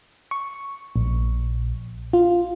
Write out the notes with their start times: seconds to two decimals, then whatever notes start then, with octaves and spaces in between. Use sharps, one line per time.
0.31 C#6
0.96 A#1
2.13 F4